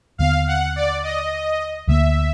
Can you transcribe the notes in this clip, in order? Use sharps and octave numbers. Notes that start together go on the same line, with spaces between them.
D#2 D3 F#3 B3 F5
F#5
D5
D#5
D2 D3 F#3 A#3 E5